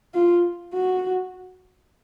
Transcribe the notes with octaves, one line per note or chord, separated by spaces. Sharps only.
F4
F#4